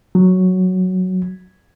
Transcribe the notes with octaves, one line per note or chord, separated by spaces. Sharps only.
F#3